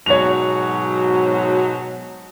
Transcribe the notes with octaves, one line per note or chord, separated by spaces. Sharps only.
G#2 B2 F#3 C#5 F7